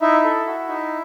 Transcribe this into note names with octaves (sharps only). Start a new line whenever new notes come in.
D#4 E4 E5
A4
F#4
D#4